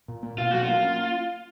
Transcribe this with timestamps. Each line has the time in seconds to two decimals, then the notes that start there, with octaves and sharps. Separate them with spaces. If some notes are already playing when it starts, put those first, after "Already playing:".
0.08 A#2
0.23 A#3
0.38 B2 F4
0.51 F#3 F#4
0.63 A#3 F4
0.84 C#4